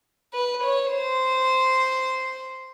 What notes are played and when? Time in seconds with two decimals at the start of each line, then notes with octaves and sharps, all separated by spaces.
0.34 B4
0.64 C#5
0.93 C5